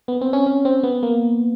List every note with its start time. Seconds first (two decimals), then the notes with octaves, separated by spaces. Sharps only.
0.08 B3
0.21 C4
0.33 C#4
0.46 C#4
0.65 C4
0.83 B3
1.03 A#3